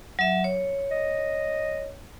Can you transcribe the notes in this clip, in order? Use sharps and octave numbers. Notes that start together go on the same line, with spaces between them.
F#3 E5
C#5
D#5